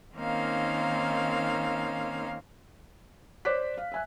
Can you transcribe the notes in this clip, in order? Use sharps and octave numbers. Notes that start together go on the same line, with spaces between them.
D#3 A#3 C4 C#4 D#4 F5
C5 D5 D6 F#6 B6
F5
E5 G#5 F#6